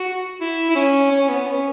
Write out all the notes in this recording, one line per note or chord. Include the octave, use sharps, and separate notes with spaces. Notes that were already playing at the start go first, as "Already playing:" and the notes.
Already playing: F#4
E4
E4
C#4
C#4
B3
C#4